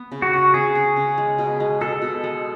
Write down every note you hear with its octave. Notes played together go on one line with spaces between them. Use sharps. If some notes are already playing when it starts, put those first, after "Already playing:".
Already playing: B3
C#3
F#4
C#3
C#3 G#4
C#3
C#3
G#3
B2
G#3
B2 A4
B2
G#3